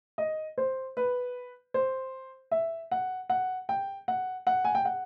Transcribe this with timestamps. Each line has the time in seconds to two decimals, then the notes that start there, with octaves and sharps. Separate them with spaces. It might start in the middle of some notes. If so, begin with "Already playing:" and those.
0.18 D#5
0.58 C5
0.97 B4
1.74 C5
2.51 E5
2.92 F#5
3.30 F#5
3.69 G5
4.08 F#5
4.47 F#5
4.65 G#5
4.75 G5
4.85 F#5